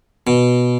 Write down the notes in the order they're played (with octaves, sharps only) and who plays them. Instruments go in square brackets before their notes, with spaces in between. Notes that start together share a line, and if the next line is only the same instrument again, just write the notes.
[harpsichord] B2